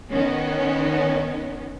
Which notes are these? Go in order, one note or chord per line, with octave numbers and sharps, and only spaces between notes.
D#3 B3 C#4